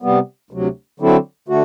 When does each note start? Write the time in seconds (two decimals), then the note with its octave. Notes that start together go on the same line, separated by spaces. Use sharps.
0.02 C3 G3 B3
0.51 D2 C3 F#3
1.00 D3 F#3 C4 E4 A4
1.48 D3 A3 F#4